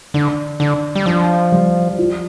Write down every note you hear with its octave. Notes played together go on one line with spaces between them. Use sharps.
D3 D4
D3 D4
G3
F3 D4
G3
F3